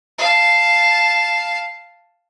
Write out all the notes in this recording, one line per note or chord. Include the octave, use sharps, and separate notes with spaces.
F5 A5